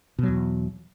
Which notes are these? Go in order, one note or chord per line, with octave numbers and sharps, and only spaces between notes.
E2 B2 F#3